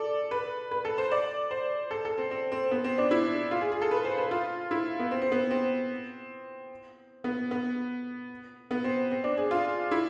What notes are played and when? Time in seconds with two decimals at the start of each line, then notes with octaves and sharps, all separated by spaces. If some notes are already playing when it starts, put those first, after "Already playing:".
Already playing: A4 D5
0.31 B4
0.71 B4
0.85 A4
0.98 C5
1.11 D5
1.51 C5
1.91 A4
2.05 A4
2.18 C4
2.31 C4
2.52 C4
2.71 B3
2.84 C4
2.98 D4
3.11 E4
3.51 F4
3.61 G#4
3.72 G#4
3.81 A4
3.91 B4
4.05 C5
4.18 B4
4.31 F4
4.71 E4
4.99 B3
5.11 C4
5.22 C4
5.32 B3
5.51 C4
7.24 B3
7.51 B3
8.71 B3
8.84 C4
9.11 C4
9.24 D4
9.37 G#4
9.51 F4
9.91 E4